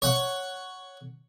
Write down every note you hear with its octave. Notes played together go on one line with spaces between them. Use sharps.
C#5 F#5